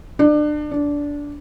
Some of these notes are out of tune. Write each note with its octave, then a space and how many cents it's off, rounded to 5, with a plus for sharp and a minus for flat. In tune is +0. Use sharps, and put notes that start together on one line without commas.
D4 +30
D4 -15